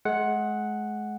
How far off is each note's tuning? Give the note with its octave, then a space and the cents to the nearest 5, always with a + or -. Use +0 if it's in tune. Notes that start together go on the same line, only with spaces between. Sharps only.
G#3 +35 F#5 +0